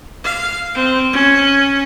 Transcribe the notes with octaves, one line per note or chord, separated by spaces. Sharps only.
F5
C4
C#4